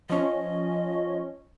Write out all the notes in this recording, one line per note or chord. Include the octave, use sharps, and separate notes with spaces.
F3 C#4 D#5